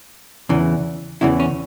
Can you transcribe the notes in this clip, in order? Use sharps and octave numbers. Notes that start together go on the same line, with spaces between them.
E2 C#3 E3
E2 C#3 E3 E4
C#4